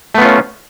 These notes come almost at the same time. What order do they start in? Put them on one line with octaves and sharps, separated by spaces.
A3 B3 F4 C#4